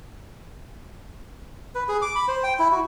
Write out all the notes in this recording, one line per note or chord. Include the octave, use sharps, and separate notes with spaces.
B4
G#4
D6
B5
C5
G5
E4
F#4